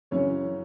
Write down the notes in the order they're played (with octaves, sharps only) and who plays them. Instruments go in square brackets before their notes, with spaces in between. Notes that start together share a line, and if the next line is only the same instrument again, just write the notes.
[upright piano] F#2 C#3 E3 C#4 C#5